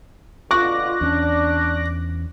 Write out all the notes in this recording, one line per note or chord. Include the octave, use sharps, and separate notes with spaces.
B2 D3 F4 C#6 D6 F#6 A#6
E2 C#4 D4